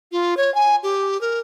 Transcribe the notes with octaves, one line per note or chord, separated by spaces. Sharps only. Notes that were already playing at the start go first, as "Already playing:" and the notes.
F4
C#5
G#5
G4
A#4